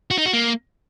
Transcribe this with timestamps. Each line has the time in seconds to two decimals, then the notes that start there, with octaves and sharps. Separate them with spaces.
0.11 F#4
0.18 D#4
0.26 F#4
0.33 A#3